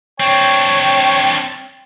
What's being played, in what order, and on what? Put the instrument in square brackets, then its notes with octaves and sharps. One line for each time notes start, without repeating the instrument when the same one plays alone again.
[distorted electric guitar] C4 D4 [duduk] C#5 [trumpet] G5